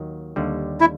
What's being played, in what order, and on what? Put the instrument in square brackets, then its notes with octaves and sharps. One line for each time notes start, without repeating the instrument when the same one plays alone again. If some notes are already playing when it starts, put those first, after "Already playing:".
Already playing: [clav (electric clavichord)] D#2 D#3 F#3
D#2 D3 G3
[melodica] E4